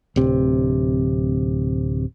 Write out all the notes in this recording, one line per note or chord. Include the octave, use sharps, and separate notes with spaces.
D1 C3